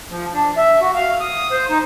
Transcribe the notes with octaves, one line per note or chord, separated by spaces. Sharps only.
F3
D4
E5
F#4
F5
D#6
C5
D#4